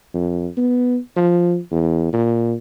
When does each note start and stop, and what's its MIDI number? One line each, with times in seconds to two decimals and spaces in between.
0.14 0.47 41
0.57 0.98 59
1.16 1.58 53
1.72 2.11 40
2.13 2.54 46